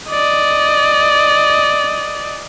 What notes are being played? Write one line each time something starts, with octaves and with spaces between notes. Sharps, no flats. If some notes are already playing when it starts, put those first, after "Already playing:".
D5 D#5